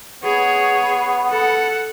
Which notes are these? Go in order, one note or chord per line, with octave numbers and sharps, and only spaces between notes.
B3 G#4 C#5
A4 F#5